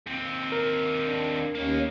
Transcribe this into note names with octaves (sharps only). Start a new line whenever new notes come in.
D#2 C4
A#4
D4
D#2 A#3 C#4 D#4